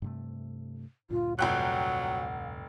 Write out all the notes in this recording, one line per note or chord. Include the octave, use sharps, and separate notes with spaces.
G2 C3 A3
D2 G2 A#2 F4
F1 F#3 F#5 G5 F#6